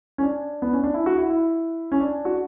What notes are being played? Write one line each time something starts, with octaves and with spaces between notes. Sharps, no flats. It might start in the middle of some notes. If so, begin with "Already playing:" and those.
C#4
D4
B3
C#4
D4
E4
F#4
E4
E4
C#4
D4
F#4